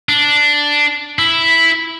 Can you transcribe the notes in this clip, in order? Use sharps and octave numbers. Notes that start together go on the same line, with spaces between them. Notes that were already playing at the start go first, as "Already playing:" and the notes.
D4
E4